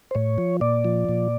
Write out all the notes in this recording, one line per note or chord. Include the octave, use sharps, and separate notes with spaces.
C5
A2 C#5
F3
A#2 D5
F3
A#2